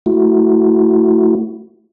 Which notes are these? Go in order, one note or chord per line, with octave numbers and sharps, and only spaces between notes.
A3 E4 F#4